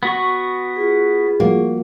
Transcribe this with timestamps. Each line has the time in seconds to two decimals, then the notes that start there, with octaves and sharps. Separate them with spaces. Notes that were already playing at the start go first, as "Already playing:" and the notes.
0.03 B3 F#4 C#6
0.76 F4 G#4
1.40 F3 G3 A#3 F#4